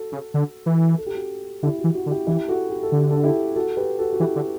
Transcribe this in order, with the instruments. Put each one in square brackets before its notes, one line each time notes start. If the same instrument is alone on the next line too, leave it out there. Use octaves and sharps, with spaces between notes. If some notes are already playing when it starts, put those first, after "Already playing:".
Already playing: [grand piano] F#4 A4
[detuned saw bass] C#3
D3
E3
[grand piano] A4
G4
F#4 A4
[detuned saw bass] D3 [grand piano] E4 G4
[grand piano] F#4
[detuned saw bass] E3
[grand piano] F#4
[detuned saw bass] D3
[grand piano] E4 G4
[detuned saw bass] E3 [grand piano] E4 G4
[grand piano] F#4 A4
G4
A4
[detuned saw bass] D3
[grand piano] G4
A4
E4 G4
F#4 A4
G4 B4
F#4 A4
F#4
[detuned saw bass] E3 [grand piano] E4 G4
[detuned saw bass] D3